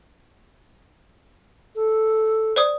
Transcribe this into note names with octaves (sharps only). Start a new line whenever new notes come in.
A4
C5 D5 D#6